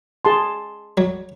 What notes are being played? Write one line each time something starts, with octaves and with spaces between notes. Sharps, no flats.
G#4 A5 C6
F#3